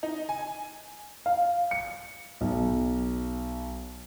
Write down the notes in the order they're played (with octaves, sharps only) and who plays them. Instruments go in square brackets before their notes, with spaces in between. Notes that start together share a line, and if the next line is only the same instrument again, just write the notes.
[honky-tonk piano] D#4
G#5
[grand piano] F5
C#7
B1